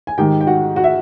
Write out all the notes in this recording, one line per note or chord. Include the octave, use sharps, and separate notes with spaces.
G#5
G#2 D#3 G4 G5
G5
F#4 F#5
F#4 F#5
E5